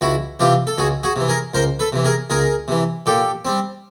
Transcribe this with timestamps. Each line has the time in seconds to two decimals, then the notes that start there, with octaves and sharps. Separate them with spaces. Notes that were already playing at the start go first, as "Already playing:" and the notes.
0.01 C#2 E4 F#4
0.40 C3 E3 F4 G4
0.67 A4
0.78 C#2 F#4 G#4
1.03 F#4 G#4
1.16 C3 E3
1.28 G#4 A#4
1.54 C#2 A#4 C5
1.79 A4 B4
1.92 C3 E3
2.04 G#4 A#4
2.30 C#2 G#4 A#4
2.68 C3 E3
3.06 A#2 G4 A4
3.45 G3 C4